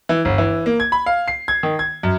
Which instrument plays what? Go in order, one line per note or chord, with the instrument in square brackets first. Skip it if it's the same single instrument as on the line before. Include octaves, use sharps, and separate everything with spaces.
[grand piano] E3
G1
E3
A#3
G#6
B5
F5
C7
G#6
D#3
G#6
F#2